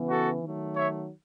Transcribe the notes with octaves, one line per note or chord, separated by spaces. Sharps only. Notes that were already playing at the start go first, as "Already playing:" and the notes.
Already playing: C#3 E3 B3
F#4 A4
D#3 F#3 A3
C#5 E5